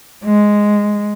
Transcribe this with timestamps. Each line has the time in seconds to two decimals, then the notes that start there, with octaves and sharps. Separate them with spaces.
0.24 G#3